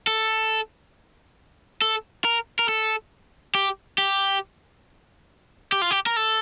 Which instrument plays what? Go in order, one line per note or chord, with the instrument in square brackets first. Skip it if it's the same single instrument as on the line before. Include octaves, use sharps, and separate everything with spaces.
[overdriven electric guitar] A4
A4
A#4
A#4
A4
G4
G4
G4
F4
G4
A#4
A4